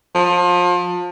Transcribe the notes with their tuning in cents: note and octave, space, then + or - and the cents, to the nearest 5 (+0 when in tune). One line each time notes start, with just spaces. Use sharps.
F3 +30